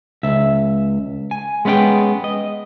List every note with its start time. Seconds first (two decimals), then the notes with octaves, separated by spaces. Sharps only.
0.23 C#2 E5
1.31 G#5
1.65 G#3 B3 C#4 F5 G5
2.24 D#5